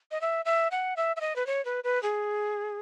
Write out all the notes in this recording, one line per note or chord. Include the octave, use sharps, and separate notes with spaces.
D#5
E5
E5
F#5
E5
E5
D#5
B4
C#5
B4
B4
G#4